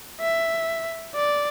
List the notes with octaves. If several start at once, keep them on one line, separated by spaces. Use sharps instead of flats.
E5
D5